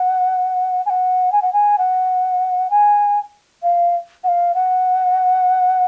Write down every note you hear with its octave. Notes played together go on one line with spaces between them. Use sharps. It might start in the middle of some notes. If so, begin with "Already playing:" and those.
Already playing: F#5
G#5
F#5
G#5
F#5
G#5
F#5
G#5
F5
F#5
F5
F#5